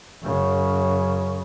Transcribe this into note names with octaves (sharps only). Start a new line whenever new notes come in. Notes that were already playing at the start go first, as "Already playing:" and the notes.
F#2 C#3